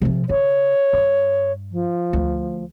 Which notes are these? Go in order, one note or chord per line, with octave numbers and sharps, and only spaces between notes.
C3 F3
C#3 C#5
G2
F3
D2